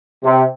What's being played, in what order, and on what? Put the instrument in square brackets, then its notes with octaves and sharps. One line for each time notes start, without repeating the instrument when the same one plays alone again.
[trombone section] C3